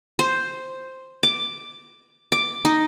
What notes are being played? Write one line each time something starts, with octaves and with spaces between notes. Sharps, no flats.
C5
D6
D6
D#4